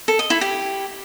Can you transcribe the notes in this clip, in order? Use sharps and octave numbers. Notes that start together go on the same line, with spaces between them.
A4
D#5
E4
G4